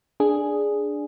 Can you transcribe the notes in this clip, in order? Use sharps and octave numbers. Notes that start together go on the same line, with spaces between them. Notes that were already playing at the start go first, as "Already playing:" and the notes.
D4 G#4